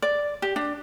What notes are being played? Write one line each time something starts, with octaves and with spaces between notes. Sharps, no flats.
D5
G4
D4